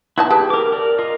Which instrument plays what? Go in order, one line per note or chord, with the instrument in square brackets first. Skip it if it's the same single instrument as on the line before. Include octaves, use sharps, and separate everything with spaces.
[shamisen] B3 D#4 A5 [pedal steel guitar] E4
[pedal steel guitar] G4 [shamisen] G#4 B4
[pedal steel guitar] A#4 D6
A#4 D5
F4 A#4 D#5